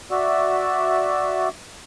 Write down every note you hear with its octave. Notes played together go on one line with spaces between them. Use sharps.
F#4 D5 E5